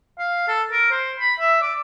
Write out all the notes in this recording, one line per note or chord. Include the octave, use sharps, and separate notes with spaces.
F5
A4
A#4
C5
B5
E5
D5